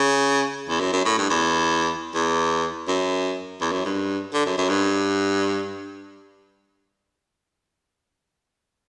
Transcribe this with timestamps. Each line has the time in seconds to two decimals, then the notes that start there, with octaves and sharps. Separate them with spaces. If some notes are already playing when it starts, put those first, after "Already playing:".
Already playing: C#3
0.69 E2
0.80 F#2
0.93 F#2
1.05 A2
1.18 G2
1.30 E2
2.15 E2
2.88 F#2
3.61 E2
3.72 F#2
3.85 G2
4.34 D3
4.46 F#2
4.58 F#2
4.69 G2